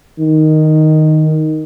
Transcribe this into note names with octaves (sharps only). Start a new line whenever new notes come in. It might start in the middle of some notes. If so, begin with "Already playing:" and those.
D#3